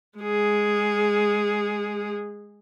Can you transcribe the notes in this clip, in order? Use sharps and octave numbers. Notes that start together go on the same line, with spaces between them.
G#3 G#4